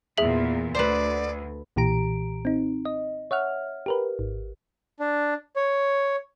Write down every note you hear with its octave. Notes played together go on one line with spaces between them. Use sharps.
E2 A#2 G#4 E5 F#7
D2 B4 C5 D5
B1 A#2 E3 G4 A#5 D7
C4 D#4
D#5
C#5 E5 F#5 F6
G4 A#4 B4
G#1
D4
C#5